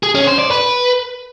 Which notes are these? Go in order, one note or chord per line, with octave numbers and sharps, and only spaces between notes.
G#4
C#4
C5
D5
B4